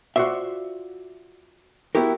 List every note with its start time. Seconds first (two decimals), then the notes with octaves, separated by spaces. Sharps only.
0.16 F4 F#4 G#4 C5 D5 E5
1.95 B3 E4 F#4 G4 A#4